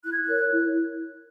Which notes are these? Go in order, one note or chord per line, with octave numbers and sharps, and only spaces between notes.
E4 F#6
G#6
F#6
A#4 C#5
E4